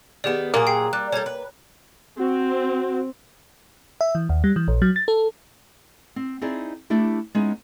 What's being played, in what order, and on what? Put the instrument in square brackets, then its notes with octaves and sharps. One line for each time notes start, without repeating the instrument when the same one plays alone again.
[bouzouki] D#3 B3 [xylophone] G4 G#4 D5
[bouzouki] A#2 F#3 G#4 [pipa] A#3
[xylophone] G5 C7
[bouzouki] G3 [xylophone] F#6
[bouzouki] G3 A4 [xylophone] C#5 A#5 G#6
[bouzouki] B4
[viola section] C4 [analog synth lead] F#4
[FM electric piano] E5
E3
D#2
G3
E3
A#1
F#3
A6
A4
[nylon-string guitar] C4
C4 D#4 E4 G#4 C5 D5
A3 D4 E4 G4
G#3 B3 C#4 D#4 E4 G#4